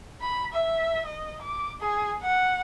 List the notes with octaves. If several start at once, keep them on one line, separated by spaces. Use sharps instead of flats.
B5
E5
D#5
D6
G#4
F#5